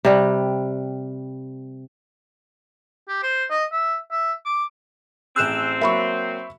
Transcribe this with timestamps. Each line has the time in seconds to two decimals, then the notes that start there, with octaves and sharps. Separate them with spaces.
0.05 C3 G3
3.08 G4
3.23 C5
3.50 D#5
3.72 E5
4.11 E5
4.46 D6
5.36 A1 C4 G#4 E6 F#6 E7
5.81 F#3 A#3 E5 B5 C#6